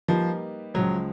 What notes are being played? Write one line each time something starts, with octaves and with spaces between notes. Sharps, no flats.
F3 G3 A#3 D#4 G4 B4
C#2 C#3 F3 F#3 G#3